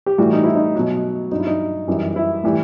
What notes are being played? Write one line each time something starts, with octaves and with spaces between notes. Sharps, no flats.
G4
A2 E3 G3 F#4
D#4
E4
D#4
B2 F#3
G2 F#3 D#4
E4
D#4
F#2 E3 G3
E4
A2 E3 G3